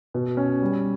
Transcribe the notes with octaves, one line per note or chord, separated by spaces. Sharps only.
B2
C#4
G3